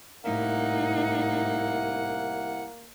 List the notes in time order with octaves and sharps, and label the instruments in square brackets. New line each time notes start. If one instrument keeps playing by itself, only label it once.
[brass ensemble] C2 E4 F#5 [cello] A2 D#4 [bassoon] A#3